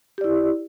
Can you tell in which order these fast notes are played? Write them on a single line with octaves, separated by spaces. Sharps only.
G4 D5 E4